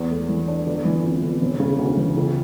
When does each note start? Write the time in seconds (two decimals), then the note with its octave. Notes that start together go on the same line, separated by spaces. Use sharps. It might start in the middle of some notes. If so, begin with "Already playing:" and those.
Already playing: E2
0.11 A3
0.29 E3
0.48 D4
0.67 G1
0.85 E3
1.04 F2
1.23 G1
1.42 E1
1.60 C#3
1.79 D2
1.97 E3
2.17 C#2